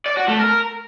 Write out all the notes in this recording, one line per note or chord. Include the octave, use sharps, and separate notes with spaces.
D5
F#4
A3
A#4